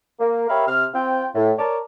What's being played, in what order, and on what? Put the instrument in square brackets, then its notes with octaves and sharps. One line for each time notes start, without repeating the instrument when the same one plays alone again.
[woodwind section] A#3
G4 A#4 C#5 E5 F5 B5
C3 F6
C4 F4 G5
A2
A#4 C#5 D5 A5